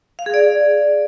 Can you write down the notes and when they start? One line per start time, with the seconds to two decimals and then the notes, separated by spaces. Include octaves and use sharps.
0.19 F5
0.26 G#4
0.34 D5